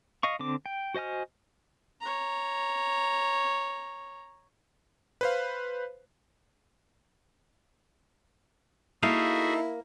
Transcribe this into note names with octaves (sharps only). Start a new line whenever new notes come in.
D#5 F5 C#6
D3 C4 D6
G5
F#4 C5 D#5 G#5 F6
C#5 A#5
B4 C5 F5
A#3 D#4 E4 F#4 G#4 A4 E5 F5